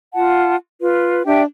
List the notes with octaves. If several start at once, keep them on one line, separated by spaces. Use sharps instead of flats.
F4 F#5 A5
F4 B4
D4 G4 E5 G5